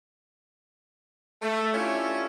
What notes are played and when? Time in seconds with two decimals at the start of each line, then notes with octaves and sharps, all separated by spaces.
1.42 A3
1.73 C#4 D4 E4 F4 G4 C#5